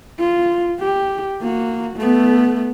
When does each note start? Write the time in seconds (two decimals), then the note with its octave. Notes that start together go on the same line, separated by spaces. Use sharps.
0.19 F4
0.80 G4
1.41 A#3 F#4
1.97 A3 B3